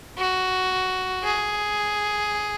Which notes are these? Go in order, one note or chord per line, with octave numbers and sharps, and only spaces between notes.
F#4
G#4